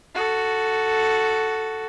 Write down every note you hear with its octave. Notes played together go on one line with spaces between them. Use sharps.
F#4 A4